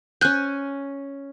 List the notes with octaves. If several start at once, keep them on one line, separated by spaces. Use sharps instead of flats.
C#4 G#5 F#6 G6